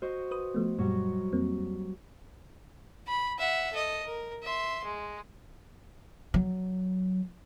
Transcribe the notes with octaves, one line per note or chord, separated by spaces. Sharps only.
F#4 C5 D#5
B4 D#6
F3 A3 B3
F#2 A#2 F#3 G3 F#4
F2 A#3 C4
B5
E5 F#5
A4 D#5
A#4
E5 C6
G#3
F#3